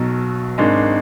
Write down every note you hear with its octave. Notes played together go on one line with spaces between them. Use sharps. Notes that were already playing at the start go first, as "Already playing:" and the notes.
Already playing: B1 B2 F#3
G#1 G#2 D#3 G#3 D4